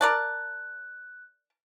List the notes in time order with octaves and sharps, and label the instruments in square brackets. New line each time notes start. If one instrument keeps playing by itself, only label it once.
[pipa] A#4 D5 A5 [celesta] F#6